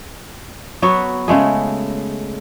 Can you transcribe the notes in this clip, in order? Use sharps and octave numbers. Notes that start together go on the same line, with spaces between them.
F#3 B3 F#4 C#5
C#3 G#3 A3 G#4